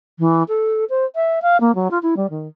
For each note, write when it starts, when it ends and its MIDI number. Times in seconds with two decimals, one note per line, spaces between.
0.19 0.43 52
0.48 0.85 69
0.90 1.05 72
1.15 1.39 76
1.42 1.57 77
1.61 1.75 58
1.75 1.91 54
1.91 1.99 65
2.03 2.15 64
2.17 2.27 55
2.30 2.48 51